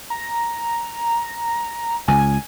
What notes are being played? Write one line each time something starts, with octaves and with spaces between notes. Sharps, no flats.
A#5
C#2 G#5